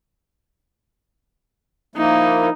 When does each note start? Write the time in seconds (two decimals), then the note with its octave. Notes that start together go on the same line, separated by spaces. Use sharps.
1.96 F3 A#3 D#4 E4